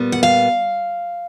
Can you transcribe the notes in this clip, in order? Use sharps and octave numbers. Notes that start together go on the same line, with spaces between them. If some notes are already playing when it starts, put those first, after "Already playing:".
Already playing: A#2 G3 B3
F#5
F5